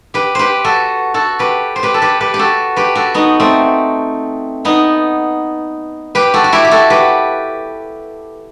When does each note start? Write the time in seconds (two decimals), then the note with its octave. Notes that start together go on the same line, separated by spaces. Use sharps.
0.14 G4 B4
0.35 G4 B4 C5
0.64 F#4 A4
1.14 F#4 A4
1.39 G4 B4
1.76 C5
1.83 G4 B4
1.94 A4
2.02 G4 B4
2.20 G4 B4
2.34 G4
2.39 F#4 A4
2.76 G4 B4
2.95 F#4 A4
3.14 B3 D#4
3.40 A3 C4
4.65 B3 D#4
6.15 G4 B4
6.34 F#4 A4
6.44 F#4
6.52 E4 G4
6.65 G4
6.71 F#4 A4
6.90 G4 B4